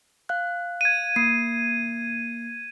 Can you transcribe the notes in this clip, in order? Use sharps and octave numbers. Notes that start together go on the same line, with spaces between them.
F5 F#6
G#6 D#7
A#3 C7